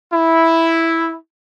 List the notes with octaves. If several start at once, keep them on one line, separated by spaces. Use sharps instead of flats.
E4